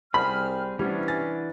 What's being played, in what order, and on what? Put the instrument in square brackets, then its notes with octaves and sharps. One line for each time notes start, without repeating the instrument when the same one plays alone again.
[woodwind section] C2 C3 F6 [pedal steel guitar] G3 C4 G#4 [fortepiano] B5
[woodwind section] C3 B3 C#4 [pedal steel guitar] E3 D4 [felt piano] G3
[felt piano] G#5 A6